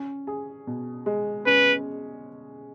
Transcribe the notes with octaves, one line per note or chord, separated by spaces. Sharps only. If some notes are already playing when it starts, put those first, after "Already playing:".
Already playing: C#4
G#4
B2
G#3
C#4 B4